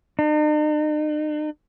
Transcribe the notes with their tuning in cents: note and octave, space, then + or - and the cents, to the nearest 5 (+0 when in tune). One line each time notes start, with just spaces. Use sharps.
D#4 -45